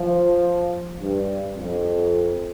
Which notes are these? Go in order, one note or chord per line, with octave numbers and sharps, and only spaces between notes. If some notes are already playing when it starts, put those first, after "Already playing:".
Already playing: F3
G2
F2